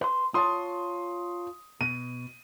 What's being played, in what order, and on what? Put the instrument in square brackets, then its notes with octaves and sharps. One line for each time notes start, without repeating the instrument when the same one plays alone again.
[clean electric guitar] B4 C6
[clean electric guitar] F4 C#5 A5 [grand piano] C6 D#6
[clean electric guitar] B2 [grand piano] D#7